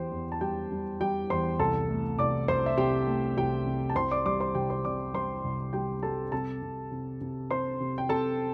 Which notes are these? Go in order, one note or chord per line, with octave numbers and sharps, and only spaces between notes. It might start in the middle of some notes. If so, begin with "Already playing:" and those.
Already playing: E2 E3 G4 C5 G5 C6
E2
A5
G3 G4 G5
G3
G3 G4 G5
E2 C5 C6
C2 A4 A5
A3
C2 D5 D6
C2 C5 C6
E5
C3 G4 G5
A3
C2 G4 G5
C3
A5
C2 C5 C6
D5 D6
G3 D5 D6
C5 C6
C2 G4 G5
C5 C6
C3 D5 D6
G3 C5 C6
C2
G3 G4 G5
G3 A4 A5
C3 A4 A5
C3
C3
C3
C3 C5 C6
C3
G5
C3 A4 A5